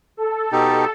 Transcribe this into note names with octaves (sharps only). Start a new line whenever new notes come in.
A4
B2 D#4 G4